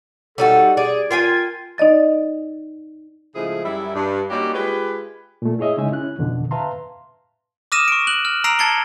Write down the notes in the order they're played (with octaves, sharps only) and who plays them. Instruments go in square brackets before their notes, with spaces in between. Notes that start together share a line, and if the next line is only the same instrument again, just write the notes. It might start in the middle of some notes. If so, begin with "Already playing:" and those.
[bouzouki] G3 D#4 F#4 [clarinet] A4
[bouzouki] G#4 [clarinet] D5
[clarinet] F4 [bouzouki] A#4 G5 G#5
[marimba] D#4 D5 D#5 A6
[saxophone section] A2 C#3 F3 G#3 E4 G#4
F#2 G3 E4
G2
G3 A#3 C#4 D#4 F#4 G4
G#3 F4 G4 B4
[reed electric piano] A#2 A3
E4 G#4 C#5 D#5 E5
C#3 G#3 D#4 E5 G#5
C#4 E4 F#6
F2 B2 D3 D#3
B4 E5 F5 A5 A#5 C6
[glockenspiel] D6 D#6 F6 A#6 D#7 E7
C#6 D7
F#6 F#7
F6
A#5 E6 A#6 C7 D7 F7
A5 G#6 A6 C7 C#7 G7